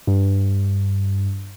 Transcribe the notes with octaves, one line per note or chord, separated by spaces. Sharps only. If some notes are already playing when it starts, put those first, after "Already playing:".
G2